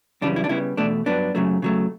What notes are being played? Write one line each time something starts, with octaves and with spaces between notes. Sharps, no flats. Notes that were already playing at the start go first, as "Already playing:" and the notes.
F#2 C#3 E3 G3 D4
E4
D4
C#3 G3 B3 E4
E2 B2 A3 D4
G2 F#3 B3 D4
F#2 C#3 F#3 A3
C#3 F#3 A3